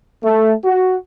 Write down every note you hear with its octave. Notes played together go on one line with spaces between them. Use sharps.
A3
F#4